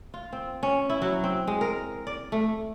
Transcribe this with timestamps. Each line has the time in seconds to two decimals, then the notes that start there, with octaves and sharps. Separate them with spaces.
0.14 F4
0.32 C4
0.63 C#4
0.90 E4
1.02 F#3
1.24 C4
1.47 G#3
1.61 A#4
2.07 D5
2.32 A3